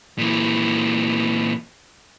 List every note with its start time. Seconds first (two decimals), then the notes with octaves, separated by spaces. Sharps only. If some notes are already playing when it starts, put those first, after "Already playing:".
0.18 A#2 E3